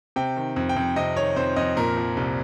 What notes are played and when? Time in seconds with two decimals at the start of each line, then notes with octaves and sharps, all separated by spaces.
0.16 C3 G5
0.37 D#3
0.56 F2
0.69 G5
0.76 F2
0.96 C3 D#5
1.16 D#3 C#5
1.36 F2 C5
1.56 F2 D#5
1.77 A#2 A#4
1.97 F3
2.17 C2